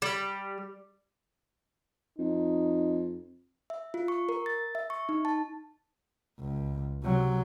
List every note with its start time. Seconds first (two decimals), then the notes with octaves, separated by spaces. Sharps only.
0.02 G3
2.19 F2 D#4
3.70 E5
3.94 F4
4.08 C#6
4.29 A#4
4.46 A6
4.75 E5
4.90 C#6
5.09 D#4
5.25 A5
6.40 C#2
7.03 C3 F#3